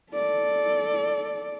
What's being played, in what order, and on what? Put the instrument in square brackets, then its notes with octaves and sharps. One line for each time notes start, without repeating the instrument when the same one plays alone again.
[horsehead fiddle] A4 D5